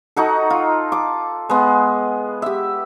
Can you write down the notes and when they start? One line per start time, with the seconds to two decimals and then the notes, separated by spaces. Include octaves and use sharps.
0.16 D#4 F#4 A4
0.50 F4
0.92 D6
1.50 G#3 B3
2.42 G4 E5